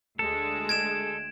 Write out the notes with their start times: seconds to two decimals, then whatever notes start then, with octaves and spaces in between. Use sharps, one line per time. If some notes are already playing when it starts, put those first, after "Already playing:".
0.19 D2 G#3 A4
0.69 G#6 D7 E7